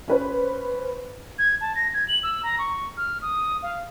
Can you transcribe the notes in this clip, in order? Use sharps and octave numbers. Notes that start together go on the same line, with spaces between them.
C#4 B4 C5
G#6
A5
A#6
G#6
F#7
E6
A#5
C#6
F6
D#6
F5